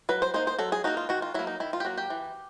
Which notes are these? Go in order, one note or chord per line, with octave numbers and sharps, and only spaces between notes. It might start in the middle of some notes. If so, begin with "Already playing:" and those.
F#3 B4
C5
A#3 D#4 C5
C5
F#3 A4
G#4
A#3 D#4 F#4
F4
D#3 F#4
F4
F#3 A#3 E4
D#4
D#3 E4
F4
G4
F#3 A#3 F#4
G4
E3